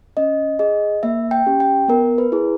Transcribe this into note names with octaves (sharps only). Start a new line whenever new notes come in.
C#4 D#5
G#4 D#5
A#3 E5
G5
C#4 G4
G5
B3 A#4
B4
E4 G#4